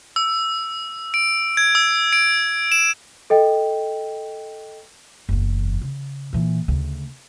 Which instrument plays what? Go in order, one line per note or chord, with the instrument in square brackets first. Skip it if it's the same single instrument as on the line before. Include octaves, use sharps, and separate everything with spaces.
[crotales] E6
D7
G#6
E6
D7
E7
[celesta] A4 D#5 G5
[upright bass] F#1 E2
C#3
A#2 E3
D2 C#3